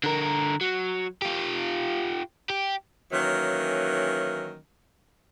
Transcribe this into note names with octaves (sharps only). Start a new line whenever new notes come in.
D3 A#4
F#3
F4 G4
G4
D#3 E3 F#3 A#3 C#4